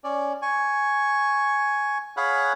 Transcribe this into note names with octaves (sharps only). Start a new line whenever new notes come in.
C#4 D5
G#5 C#6
G#4 C#5 F5 F#5 B5 F#6